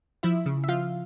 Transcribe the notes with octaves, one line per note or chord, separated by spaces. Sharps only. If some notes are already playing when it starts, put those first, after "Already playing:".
F3 E4 E5
C#3
E5
F3 F4 F5